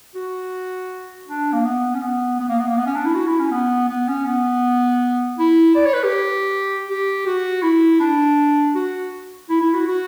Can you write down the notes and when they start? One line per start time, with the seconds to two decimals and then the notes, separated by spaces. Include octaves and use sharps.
0.15 F#4
1.28 D4
1.53 A#3
1.64 B3
1.94 C#4
2.02 B3
2.40 B3
2.49 A#3
2.59 B3
2.67 A#3
2.77 B3
2.86 C#4
2.96 D4
3.05 E4
3.14 F#4
3.27 E4
3.39 C#4
3.51 B3
3.88 B3
4.08 C#4
4.26 B3
5.39 E4
5.75 D5
5.85 C#5
5.94 B4
6.04 G4
6.88 G4
7.26 F#4
7.62 E4
8.00 D4
8.75 F#4
9.49 E4
9.61 E4
9.74 F#4
9.87 F#4